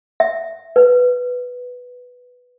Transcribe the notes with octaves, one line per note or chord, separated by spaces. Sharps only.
E5
B4